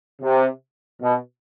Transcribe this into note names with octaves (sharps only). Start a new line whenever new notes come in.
C3
B2